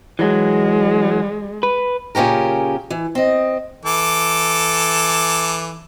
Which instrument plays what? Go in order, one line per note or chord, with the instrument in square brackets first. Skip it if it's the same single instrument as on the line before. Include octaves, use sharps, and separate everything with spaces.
[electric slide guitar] E3 F#3 [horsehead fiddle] G#3
[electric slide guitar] B4
[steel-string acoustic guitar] A#2 C#3 C#4 G4 A#4
E3
C4 D#5
[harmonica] E3 A4 D6